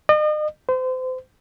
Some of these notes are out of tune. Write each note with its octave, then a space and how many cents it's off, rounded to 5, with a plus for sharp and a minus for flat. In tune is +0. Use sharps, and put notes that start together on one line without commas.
D#5 -40
C5 -35